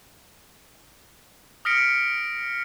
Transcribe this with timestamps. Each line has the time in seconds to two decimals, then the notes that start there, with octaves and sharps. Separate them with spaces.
1.65 D#6 F6 A#6 B6 C#7 D7